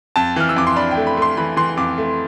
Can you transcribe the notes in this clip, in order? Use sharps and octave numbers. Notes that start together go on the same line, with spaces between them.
F2 A5
E3 F6
E6
F2 D6
C6
D4 B5
G5
A3
B5
A3 C6
E3 B5
E3 C6
F2 D6
A3